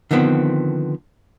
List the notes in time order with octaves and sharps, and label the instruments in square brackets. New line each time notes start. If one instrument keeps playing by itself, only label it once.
[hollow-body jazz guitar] D3 D#3 F3 B3 C4